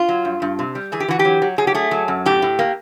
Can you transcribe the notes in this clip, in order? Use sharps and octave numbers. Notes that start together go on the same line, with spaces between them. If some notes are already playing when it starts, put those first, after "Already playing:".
Already playing: F4
F#3
G2
G2
C3
G3
E3 G#4
G4
E3 F#4
G4
F#3
F#3
F#3 G#4
G4
A3 G#4
F#3
F#2
A2 G4
A2
A#3